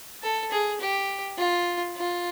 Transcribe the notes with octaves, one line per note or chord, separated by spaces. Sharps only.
A4
G#4
G4
F4
F4